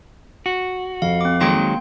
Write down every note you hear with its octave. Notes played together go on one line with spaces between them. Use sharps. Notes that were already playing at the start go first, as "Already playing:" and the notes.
F#4
F2 F5
C4 D6
D#3 F#3 G#3 A#3 G5 C6